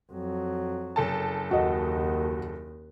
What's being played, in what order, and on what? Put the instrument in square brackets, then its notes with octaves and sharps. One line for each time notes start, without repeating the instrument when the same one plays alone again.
[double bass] F2 F#3
[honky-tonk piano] F#1 A4 A5
[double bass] D#2 [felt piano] F#4 D#5